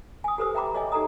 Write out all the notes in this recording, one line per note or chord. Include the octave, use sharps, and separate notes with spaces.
G#5 D#6
G4 A4 B4 C5 D#6 E6
E5 G5 A#5 B5 D6
G#4 C#5 D#5 E5 G#5
D#4 G4 A4 D#5 A#5 D#6